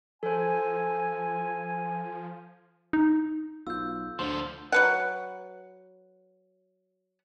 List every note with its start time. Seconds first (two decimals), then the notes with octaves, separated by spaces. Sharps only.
0.23 F3 A4 C5 G#5
2.93 D#4
3.67 B1 F4 E6 G6
4.19 D2 D3 F3 C5 C6
4.72 F#3 B4 F#5